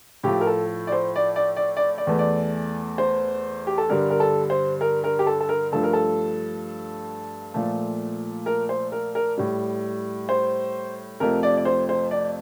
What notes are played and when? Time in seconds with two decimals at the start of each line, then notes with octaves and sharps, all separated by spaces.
0.23 A2 F3 A3 G4
0.41 A#4
0.47 A4
0.87 D5
0.92 C5
1.16 D5
1.36 D5
1.56 D5
1.77 D5
1.98 D5
2.07 E2 E3 A3
2.19 D5
2.98 C5
3.67 G4
3.78 A4
3.89 G2 D3 G3 A#4
4.10 A#4
4.20 A4
4.50 C5
4.81 A#4
5.04 A#4
5.19 G4
5.27 A4
5.41 A4
5.49 A#4
5.72 G2 F3 A3 A4
5.83 A#4
5.93 A4
7.54 A#2 F3 A3
8.46 A#4
8.69 C5
8.92 A#4
9.15 A#4
9.37 A2 G3
10.29 C5
11.20 F2 C3 F3 A3 A#4
11.43 D5
11.57 D5
11.65 C5
11.89 C5
12.11 D5